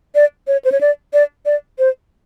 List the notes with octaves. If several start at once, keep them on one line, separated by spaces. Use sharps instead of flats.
D5
C#5
C5
C#5
D5
D5
D5
C5